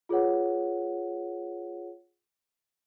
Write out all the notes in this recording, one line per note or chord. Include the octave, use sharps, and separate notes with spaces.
F4 G#4 B4 C#5 F#5